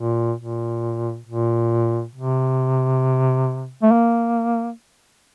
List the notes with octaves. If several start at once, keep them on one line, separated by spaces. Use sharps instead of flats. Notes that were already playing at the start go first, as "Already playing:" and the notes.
Already playing: A#2
A#2
A#2
C3
A3
A#3